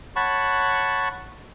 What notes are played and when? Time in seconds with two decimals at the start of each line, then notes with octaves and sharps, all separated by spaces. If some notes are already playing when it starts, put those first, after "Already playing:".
0.16 C#5 F#5 A5 B5 C#6